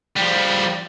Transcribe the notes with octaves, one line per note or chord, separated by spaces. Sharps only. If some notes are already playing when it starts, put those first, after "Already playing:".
F3 G3